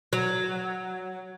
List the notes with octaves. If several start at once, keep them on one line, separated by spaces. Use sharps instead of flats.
F#3